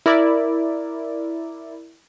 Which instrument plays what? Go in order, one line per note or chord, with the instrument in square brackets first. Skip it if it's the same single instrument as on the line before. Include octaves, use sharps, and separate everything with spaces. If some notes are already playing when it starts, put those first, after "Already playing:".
[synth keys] E4 A#4 D5